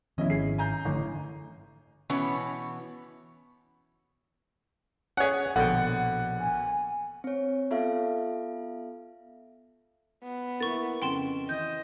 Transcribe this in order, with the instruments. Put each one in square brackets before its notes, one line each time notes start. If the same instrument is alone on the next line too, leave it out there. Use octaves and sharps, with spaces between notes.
[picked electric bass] D#3 F3 B3 [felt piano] C#4 E4 [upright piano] D#5
[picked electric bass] G#1 [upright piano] G#4 C7
[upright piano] G#5 A#5 G6
[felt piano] A1 [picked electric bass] D3
[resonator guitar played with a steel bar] B2 E3 B3 C#4 C#5
[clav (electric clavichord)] C#4 G#4 [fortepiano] C#5 F#5
[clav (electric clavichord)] A#1 B2 G5 [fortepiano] D3 [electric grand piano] F#5
[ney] G#5
[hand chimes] C4 C#5
B3 F4 A4 E5 F5
[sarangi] B3
[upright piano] A#3 E4 [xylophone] C#6 A6
[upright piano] F2 C#3 [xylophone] G5 C6 E7
[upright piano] E3 [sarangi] D#5 [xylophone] G6